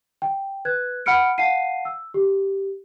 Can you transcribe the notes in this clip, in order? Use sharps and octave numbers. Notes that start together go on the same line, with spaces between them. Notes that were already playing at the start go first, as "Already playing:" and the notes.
G5
B4 F#6 G#6
F#5 B5 F6 C#7 D7
F5 F#5 A5 C7 D#7
E6
G4